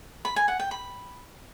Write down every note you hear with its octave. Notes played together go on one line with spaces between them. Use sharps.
B5
G#5
F#5
G5
B5